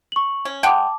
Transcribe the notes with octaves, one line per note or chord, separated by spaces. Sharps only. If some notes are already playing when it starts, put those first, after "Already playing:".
C#6 F#7
C#4
G#3 F#5 G5 A5 D6